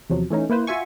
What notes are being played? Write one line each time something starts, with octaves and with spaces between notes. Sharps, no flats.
E2 C3 F3 F#3
E3 A3 C#4 D#4
A#3 E4 B4 C5
F4 F#4 E5 G#5 C#6